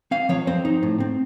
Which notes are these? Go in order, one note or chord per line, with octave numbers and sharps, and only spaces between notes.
C4 F5
F3 C#5
C4 C5
D#4
A2
C4